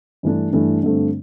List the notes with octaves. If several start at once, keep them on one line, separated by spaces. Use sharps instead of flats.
G2 E3 A3 D4
G2 E3 A3 D4
G2 D3 A3 C4